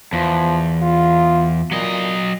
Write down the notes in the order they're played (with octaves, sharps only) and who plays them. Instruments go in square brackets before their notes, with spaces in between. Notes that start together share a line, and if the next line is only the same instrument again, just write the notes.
[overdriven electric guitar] E2 [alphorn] F3
[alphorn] F4
[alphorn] A#2 [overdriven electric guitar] F#3 D#5